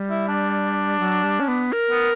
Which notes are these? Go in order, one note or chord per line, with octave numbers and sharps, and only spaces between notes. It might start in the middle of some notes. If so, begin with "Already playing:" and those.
Already playing: G3
E4
D4
F#3
G3
C#4
B3
A#4
B3